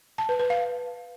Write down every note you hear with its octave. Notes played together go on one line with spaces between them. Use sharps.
A5
B4
B4
F5